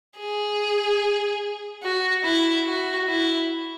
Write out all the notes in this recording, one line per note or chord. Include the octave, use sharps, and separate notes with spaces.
G#4
F#4
E4
F#4
E4